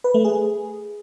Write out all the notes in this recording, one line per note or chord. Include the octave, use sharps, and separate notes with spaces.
B4
A3
G#4